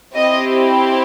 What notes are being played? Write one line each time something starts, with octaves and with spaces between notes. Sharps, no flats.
C4 E4 G4 D#5